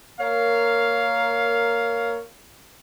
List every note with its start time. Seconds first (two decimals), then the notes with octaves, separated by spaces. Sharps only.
0.20 A#3 A#4 C#5 F5